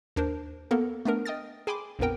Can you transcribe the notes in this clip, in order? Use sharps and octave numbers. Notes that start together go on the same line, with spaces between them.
D#2 D4 A#4 C5
A#3 B3 F#4 A4 A#4
A3 B3 D4 A#4
D#5 G5 D#6 F6 A6
G#4 G5 G#5 B5 C6 D6
A#1 F2 A#2 B3 A#4 G5